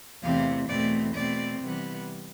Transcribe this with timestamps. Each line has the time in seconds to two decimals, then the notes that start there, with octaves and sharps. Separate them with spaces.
0.22 E2 C3 E3 A3 C4 F5
0.69 E2 B2 A3 C4 D5
1.14 B2 A3 C4 D5
1.60 C3 E3 G3 B3